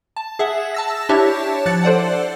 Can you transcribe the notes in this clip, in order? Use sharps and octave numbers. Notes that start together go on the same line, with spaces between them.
A5
G#4 E5 F#5
A5 E6 A#6
D4 E4 G4 C#5 E5 A5
F3 F#6 A6 C#7
A4 C5 D5 F#5